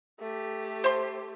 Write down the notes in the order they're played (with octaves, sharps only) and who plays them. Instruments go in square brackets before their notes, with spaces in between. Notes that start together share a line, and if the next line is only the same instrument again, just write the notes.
[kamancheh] A3 G4
[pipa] C5 C6